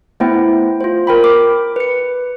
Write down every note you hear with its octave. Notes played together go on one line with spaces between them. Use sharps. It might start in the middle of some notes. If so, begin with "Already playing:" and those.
A3 B3 E4 C5 G5
F4 C5
A#4 G5 B5
D6
B4 C#7